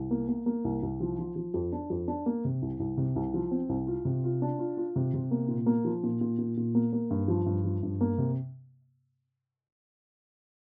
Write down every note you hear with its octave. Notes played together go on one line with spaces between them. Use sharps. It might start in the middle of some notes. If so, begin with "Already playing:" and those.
Already playing: C2
A#3
A#3
A#3
C2
C2
F3
F3
F3
F2
D4
F2
D4
A#3
C3
C2
C2
C3
C2
F3
C4
C2
F4
C3
F4
D4
F4
F4
C3
C3
A#3
A#2
A#3
F3
A#2
A#2
A#2
A#2
A#3
A#3
G2
F3
G2
F3
G2
A#3
C3